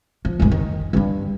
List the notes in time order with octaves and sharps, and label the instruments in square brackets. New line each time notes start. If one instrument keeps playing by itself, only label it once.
[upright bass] F3
F1 G#2
D#3
G2 D4